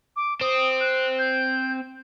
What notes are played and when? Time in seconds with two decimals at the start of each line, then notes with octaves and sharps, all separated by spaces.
0.16 D6
0.41 C4 D#6
0.81 F#6
1.19 G6